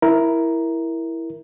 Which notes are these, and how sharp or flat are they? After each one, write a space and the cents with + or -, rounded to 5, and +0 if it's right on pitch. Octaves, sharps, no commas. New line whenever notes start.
E4 +0 A#4 +5